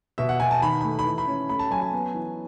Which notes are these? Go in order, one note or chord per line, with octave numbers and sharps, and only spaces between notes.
B2 E5
F#5
B2 G#5
A5
D#3 B5
A3 B5
B5
E3
B5
C#4
A3 B5
A5
F#3 G#5
G#5
B3
E3